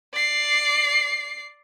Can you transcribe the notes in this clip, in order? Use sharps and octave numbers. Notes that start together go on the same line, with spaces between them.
D5 C7